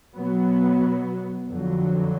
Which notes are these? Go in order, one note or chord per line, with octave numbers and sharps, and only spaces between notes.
B2 F#3 B3
F2 D3 F#3